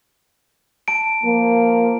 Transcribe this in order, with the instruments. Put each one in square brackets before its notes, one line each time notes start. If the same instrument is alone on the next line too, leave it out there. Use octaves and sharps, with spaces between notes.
[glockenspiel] A5 D7
[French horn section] F3 A#3